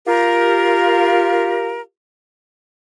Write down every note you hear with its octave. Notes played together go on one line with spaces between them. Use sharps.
F4 G4 A#4